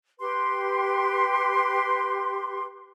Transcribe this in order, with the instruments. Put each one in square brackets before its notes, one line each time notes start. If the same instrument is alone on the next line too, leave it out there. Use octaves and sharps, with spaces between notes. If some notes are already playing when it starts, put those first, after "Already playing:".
[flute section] G4 B4 C6